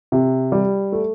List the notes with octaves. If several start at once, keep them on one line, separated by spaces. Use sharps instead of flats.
C3
G3
A3